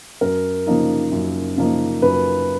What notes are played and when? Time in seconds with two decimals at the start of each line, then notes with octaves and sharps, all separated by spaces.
0.21 F#2 A#4
0.67 C#3 F3 A#3 D#4
1.12 F#2
1.57 C#3 F3 A#3 D#4
2.02 F#2 B4